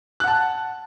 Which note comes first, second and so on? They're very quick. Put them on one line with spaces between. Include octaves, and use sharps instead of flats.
F#6 F#5 A5